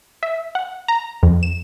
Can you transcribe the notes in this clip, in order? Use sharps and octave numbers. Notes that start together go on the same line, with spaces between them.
E5
F#5
A#5
F2
E7